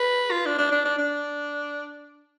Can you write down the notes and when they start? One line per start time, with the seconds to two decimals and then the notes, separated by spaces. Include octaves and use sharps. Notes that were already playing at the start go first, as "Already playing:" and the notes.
Already playing: B4
0.31 F4
0.46 D4
0.58 D4
0.72 D4
0.85 D4
0.98 D4